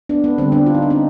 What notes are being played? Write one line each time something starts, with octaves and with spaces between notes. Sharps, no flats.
B3 D4
B3
D3 G3 C4
B3 D4
F4
D#4
D4
D3 C4 D#4